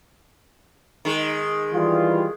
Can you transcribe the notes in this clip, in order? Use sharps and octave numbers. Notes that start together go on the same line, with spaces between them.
D#3 G#3
E3 G3 F4